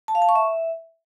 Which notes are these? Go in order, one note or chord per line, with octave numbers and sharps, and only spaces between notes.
A5
F5
A5
C#6
E5